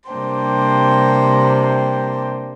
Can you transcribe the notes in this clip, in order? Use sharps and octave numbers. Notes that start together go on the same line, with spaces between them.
C3 G3 A#3 D4 C5 G5